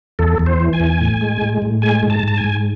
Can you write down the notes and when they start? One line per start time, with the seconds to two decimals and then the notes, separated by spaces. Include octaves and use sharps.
0.19 E2 A4
0.39 E2
0.46 C5
0.60 E3
0.73 G#5
0.80 E2
1.01 A2
1.21 G#3
1.42 A2
1.62 A2
1.82 G#3 G#5
2.03 G#2
2.10 A5
2.23 G#2 A5
2.37 G#5
2.44 G#2